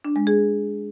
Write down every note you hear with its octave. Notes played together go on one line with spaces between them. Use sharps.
D4
G#3
G#4